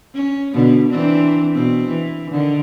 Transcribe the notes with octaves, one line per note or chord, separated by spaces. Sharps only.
C#4
B2 D3 D4
E3 C4 D4
B2 C4
E3
D3 D#3